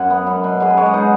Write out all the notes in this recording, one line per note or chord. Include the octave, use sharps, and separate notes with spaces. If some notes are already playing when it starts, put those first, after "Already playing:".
Already playing: F#2 F#5 G#5
B3
F#2
B2
G#3 G#4
B4
G#3 C#5
D#5
D#4 F#5